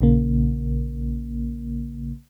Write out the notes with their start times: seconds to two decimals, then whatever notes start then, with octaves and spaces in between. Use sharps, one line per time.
0.01 A#1 C#3 A#3